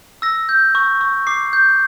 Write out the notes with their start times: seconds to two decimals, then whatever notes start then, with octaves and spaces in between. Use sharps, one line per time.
0.22 E6 A#6
0.49 G6
0.75 C#6
1.01 C#6
1.27 D6 C7
1.53 G6